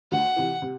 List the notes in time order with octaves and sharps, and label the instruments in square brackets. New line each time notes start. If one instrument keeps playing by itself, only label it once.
[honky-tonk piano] D2 [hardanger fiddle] F#5
[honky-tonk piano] C3 E3
C3